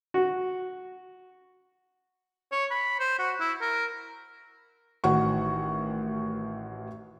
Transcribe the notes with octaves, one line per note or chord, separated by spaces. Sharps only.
F#4
C#5
B5
C5
F#4
E4
A#4
A1 D#3 F#4 F#5 C#6